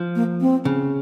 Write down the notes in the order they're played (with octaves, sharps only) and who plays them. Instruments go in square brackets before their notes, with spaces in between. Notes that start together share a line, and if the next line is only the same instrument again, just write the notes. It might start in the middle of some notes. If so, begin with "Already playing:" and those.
Already playing: [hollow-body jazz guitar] F3
[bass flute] A#3
C4
[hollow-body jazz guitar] C#3